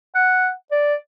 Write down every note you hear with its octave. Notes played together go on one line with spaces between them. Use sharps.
F#5
D5